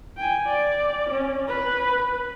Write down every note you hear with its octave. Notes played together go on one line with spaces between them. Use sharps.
G5 G#5
D5
C#4
B4